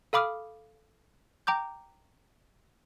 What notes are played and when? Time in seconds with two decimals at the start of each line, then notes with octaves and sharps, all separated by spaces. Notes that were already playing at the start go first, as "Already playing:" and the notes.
0.13 A4 F5 B5 D6 D#6 F6
1.47 G5 A#5 D6 G6